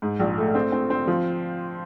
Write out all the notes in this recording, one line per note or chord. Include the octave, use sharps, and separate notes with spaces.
G#2
A#1
A3
C4
C4
C4
F3